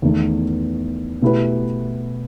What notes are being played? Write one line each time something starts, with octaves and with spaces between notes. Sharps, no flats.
E2 D#3 A3
B2 A3 E4 G4 B4